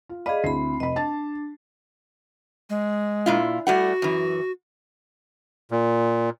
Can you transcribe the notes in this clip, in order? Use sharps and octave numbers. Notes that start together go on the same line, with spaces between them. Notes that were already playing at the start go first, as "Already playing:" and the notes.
F4
G#4 D5 D#5 F5 B5
D2 C4 E4 B5 C7
F1 D#5 B5
D4 A5 A6
G#3
A#2 E4 F4
G3 A3 F#4 F#5
F#2 E3
A#2